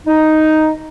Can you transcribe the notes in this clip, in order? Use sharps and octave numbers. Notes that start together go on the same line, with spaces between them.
D#4